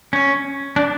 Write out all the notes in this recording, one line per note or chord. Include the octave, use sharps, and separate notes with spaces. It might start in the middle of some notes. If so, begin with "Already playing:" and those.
C#4
D4